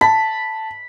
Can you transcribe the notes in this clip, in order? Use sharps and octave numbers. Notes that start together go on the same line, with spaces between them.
A5 B5